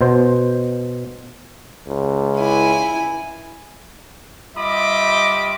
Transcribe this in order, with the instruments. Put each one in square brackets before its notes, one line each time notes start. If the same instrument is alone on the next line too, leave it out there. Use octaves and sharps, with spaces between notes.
[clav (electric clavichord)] B2 C5
[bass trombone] C#2
[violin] E4 G#5
[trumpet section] G3 F4 D#5 E5 B5 D6